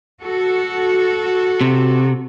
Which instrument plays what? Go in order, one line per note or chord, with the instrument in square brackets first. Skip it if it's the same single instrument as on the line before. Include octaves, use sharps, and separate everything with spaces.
[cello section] F#4 A4
[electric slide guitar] C3